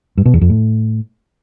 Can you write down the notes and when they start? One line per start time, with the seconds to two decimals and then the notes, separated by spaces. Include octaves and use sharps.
0.17 G2
0.25 B2
0.33 E2
0.41 F2
0.49 A2